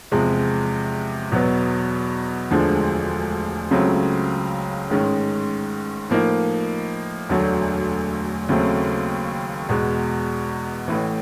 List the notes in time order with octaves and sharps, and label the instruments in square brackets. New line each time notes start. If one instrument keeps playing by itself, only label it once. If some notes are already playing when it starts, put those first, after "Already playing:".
[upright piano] E2 C3 F3 G#3
E2 B2 F#3 B3
E1 D2 D3 F3 G#3
C#2 C#3 F#3 A3 C4
A1 G#2 D#3 G#3 C#4
A2 F3 A#3 D#4
E1 D2 D3 F#3 A3
D#2 C#3 F#3 A3 C4
E2 B2 G#3
A1 A2 E3